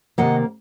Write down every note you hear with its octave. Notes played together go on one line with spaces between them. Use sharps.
C3 D#3 A#3 D#5 F#5